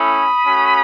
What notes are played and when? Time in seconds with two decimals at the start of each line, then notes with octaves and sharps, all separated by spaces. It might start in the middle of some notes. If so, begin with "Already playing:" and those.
Already playing: A3 C#4 E4 B5 D#6
0.46 A3 C#4 F#4